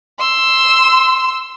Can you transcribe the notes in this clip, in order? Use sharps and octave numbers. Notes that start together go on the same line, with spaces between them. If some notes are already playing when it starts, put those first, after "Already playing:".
C6 E6